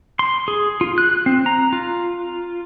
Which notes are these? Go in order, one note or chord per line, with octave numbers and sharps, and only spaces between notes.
C6
G#4
F4
F#6
C4
A#5
F4